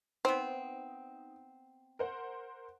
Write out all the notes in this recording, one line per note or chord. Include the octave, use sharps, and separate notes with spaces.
B3 C4 D#4 C5
A#4 C5 F#5